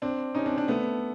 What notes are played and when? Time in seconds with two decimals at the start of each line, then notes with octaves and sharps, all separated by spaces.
0.02 C4 D4
0.35 C#4 D#4
0.46 C4 D4
0.57 C4 D4
0.68 A3 B3